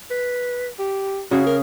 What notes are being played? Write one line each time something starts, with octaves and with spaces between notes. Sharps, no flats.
B4
G4
C#3 F#4 G#4
A#4